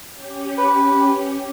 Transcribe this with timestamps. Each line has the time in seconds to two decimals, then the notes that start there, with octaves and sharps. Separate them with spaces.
0.13 C#4 G4
0.58 B4